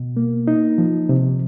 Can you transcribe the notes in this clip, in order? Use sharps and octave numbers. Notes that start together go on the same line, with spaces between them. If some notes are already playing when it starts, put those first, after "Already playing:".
Already playing: B2
A#3
D#4
F3
C3